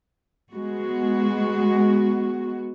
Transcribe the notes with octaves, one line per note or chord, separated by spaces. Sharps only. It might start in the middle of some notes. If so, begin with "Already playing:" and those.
G#3 B3 F#4